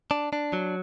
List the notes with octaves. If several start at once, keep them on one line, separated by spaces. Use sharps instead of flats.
D4
D4
F#3